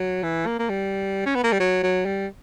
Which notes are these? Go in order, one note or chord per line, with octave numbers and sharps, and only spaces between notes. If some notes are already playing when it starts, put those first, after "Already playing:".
Already playing: F#3
E3
A#3
A#3
G3
C#4
B3
A#3
G3
F#3
F#3
G3